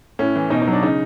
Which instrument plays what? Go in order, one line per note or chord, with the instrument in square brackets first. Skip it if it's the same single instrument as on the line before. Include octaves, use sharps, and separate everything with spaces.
[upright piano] A2 C#4
E3
B2 D#4
D#4
F#3
D4
C#3 D#4